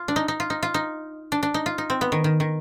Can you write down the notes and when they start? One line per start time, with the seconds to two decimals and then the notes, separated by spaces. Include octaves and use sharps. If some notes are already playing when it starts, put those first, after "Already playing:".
Already playing: F4
0.08 D4
0.16 D#4
0.28 D#4
0.40 F4
0.50 D#4
0.63 F4
0.74 D#4
1.32 D4
1.43 D4
1.54 D#4
1.66 F4
1.78 D#4
1.90 C4
2.01 B3
2.12 D#3
2.24 D#3
2.40 D#3